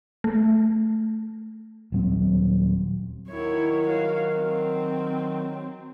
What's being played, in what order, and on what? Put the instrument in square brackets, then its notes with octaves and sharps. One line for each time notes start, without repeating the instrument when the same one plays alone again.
[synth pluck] A3
[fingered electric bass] D#1 F#3 C4
[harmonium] D#3 F#3 [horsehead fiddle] E4 C#5
[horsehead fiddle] F#4 F5
C4